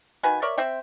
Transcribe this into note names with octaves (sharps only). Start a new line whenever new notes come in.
D#3 F#4 B4 G#5
A#4 C#5 D5 E5
C4 C5 E5 G5